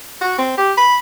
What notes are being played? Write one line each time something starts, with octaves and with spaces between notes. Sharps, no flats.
F#4
C4
G4
B5